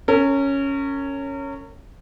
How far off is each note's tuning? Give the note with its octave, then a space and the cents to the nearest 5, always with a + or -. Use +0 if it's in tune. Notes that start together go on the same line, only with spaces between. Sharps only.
C#4 +0 A#4 -35